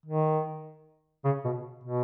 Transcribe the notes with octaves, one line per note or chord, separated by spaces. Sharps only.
D#3
C#3
B2
B2